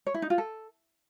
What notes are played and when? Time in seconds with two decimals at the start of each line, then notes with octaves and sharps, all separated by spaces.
0.07 C#5
0.14 E4
0.22 D#4
0.30 F4
0.38 A4